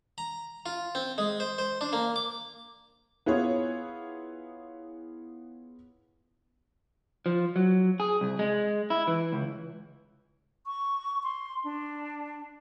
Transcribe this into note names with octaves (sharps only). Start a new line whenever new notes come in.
A#5
F4
C4
G#3
C5
C5
D4
A#3
D6
B3 E4 F4 G#4 B4 C#5
F3
F#3
G#4
C2
G#3
E4
E3
C#2
C#6
C6
D4